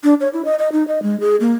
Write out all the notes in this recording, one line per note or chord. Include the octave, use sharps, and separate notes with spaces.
D4
C#5
E4
D#5
D#5
D#4
D#5
G#3
G#4
A#3